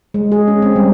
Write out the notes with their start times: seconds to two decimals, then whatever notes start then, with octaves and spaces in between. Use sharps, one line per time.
0.14 G#3
0.32 G#4
0.48 C#4
0.62 C4
0.76 G3